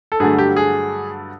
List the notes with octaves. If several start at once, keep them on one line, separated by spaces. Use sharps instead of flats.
A4
G2 D3 F#3 A3 G#4
G4
G#4